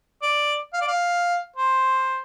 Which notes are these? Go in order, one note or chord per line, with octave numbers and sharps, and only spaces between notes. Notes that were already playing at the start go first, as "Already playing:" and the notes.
D5
F5
D5
F5
C5